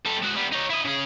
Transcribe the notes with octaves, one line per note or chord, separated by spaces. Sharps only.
G3 A4
G#3 F#4
G3 B3
D#4 C#5
E4 D#5
C#3 G#4